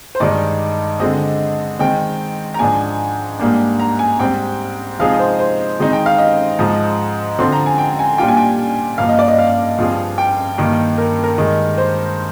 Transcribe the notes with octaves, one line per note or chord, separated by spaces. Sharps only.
C5
G2 D#3 G#3 D#4 D5
D3 G#3 C4 D#5
D#3 G#3 C4 G5
A#5
G#2 F3 G#3 D4 G#5
G#2 G3 A#3 D4
A#5
G#5
G#2 G3 C4 G5
C3 F3 G#3 D#4 G#4 F5
C5
C5
D#3 G#3 C4 D#4
G5
F5
D#5
G#2 F3 G#3
D3 F3 C4 C6
A#5
G#5
G5
G#5
A#2 G3 D4 F4 G5
G#5
G5
G2 F3 A#3 F5
D#5
D5
D#5
F5
G2 F3 C4 F4 G#4
G5
G2 D#3 A#3
A#4
A#4
G2 D#3 G#3
C5